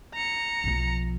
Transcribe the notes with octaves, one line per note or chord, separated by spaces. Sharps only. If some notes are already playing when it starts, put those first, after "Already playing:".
A#5 C#7
B1 F3